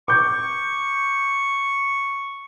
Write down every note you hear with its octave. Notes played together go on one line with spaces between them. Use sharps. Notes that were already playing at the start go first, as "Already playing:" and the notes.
C#6 D6 G6